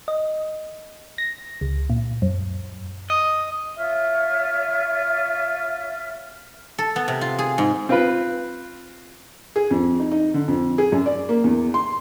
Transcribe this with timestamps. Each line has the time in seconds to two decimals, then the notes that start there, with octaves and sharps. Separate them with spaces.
0.08 D#5
1.18 A#6
1.61 C#2
1.90 A#2
2.22 F#2
3.10 D#5
3.76 F4 C#5 E5 F6
6.78 A4
6.96 B3
7.08 C3
7.21 F4
7.39 G#4
7.58 G#2
7.89 C4 F4 B4
9.56 G#4
9.71 F2
10.00 D#4
10.12 D#4
10.34 D3
10.48 F2
10.78 G#4
10.92 F#2
11.06 D5
11.29 A#3
11.44 E2
11.74 C6